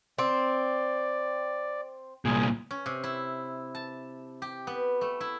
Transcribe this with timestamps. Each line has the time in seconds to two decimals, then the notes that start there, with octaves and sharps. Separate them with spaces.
0.18 C4 D5
2.25 C2 A#2 G#4
2.71 C#4
2.86 C3
3.04 E4
3.75 A5
4.42 G4
4.67 B3
5.01 A3
5.21 E4